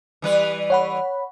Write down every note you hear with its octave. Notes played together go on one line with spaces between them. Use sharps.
E3 G3 B4
C#5 F#5 B5